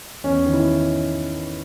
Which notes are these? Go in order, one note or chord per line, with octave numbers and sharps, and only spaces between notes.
E2 C#4
D#3
E4